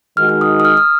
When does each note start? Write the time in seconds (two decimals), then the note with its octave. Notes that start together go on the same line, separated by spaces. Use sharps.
0.17 D#3 G#3 D#4 F#4 F6
0.29 F6
0.41 D#6
0.60 D#6
0.65 F6
0.77 F6